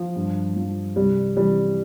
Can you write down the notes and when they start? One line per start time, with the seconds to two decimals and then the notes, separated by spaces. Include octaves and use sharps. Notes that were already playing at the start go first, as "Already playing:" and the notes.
Already playing: F3
0.16 G2
0.56 F3
0.96 C2 G3
1.37 C3 E3 G3